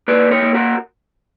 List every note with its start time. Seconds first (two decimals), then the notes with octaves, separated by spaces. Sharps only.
0.08 A#3 B4 D5
0.31 A#4 C#5
0.42 A#3
0.54 F#4 A#4